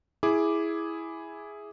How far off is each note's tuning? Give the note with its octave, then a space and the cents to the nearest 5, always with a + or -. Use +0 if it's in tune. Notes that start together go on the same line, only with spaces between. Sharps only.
E4 +0 G#4 +0 D6 +0